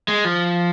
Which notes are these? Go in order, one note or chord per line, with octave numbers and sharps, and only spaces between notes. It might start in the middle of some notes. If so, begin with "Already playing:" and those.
G#3
F3